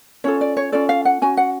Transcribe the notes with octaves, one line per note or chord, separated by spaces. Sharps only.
C#4 F4 A4 C#5
D5
C#5
C#4 F4 A4 D5
F5
F#5
C#4 F#4 G#5
F#5